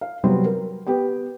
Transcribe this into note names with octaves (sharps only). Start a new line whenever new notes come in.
F5
C3 F#3 G3 B3 C4
A#4
B3 G4 G5